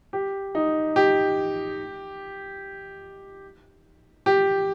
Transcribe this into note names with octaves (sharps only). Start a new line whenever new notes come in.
G4
D#4
G4
G4